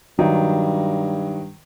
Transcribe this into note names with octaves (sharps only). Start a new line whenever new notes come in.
G2 D#3 F#3